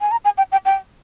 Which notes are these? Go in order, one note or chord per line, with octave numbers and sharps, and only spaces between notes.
G#5
A#5
G#5
G5
G5
G5